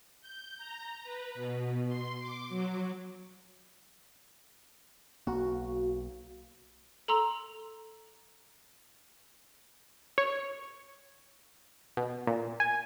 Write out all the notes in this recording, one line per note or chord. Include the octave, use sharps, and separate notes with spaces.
G6
A#5
B4
B2
C6
D6
F#3
B1 A#3 F#4
A4 A#5 C6 E6 F7
C#5
B2
A#2
G#5